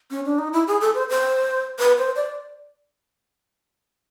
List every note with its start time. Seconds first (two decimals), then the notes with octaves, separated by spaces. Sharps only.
0.11 C#4
0.25 D4
0.39 D#4
0.53 E4
0.68 G#4
0.81 A4
0.95 C5
1.10 C5
1.79 B4
1.98 C5
2.16 D5